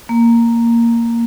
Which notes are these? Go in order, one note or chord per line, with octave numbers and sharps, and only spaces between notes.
A#3